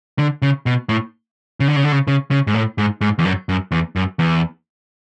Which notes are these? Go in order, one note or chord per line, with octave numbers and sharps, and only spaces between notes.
D3
C#3
B2
A2
C#3
D3
C#3
D3
C#3
C#3
C#3
G#2
A2
G#2
G#2
E2
F#2
F#2
E2
F#2
E2